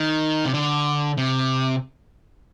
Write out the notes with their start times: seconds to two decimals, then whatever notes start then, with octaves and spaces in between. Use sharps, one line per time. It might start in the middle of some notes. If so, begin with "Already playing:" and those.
Already playing: D#3
0.45 C3
0.54 D3
1.17 C3